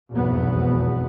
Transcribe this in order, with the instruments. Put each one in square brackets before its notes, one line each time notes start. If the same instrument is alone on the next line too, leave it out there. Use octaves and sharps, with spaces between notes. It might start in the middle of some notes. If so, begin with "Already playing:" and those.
[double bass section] F1 B1 E2 G#2 B3